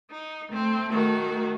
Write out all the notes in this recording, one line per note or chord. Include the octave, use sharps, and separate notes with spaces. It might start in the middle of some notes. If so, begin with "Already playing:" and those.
D#4
A3 C4
D#3 F#4